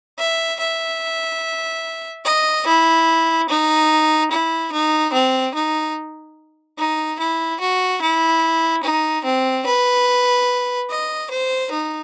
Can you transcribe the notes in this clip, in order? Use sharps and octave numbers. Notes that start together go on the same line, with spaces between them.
E5
E5
D#5
E4
D#4
E4
D#4
C4
D#4
D#4
E4
F#4
E4
D#4
C4
B4
D#5
C5
D#4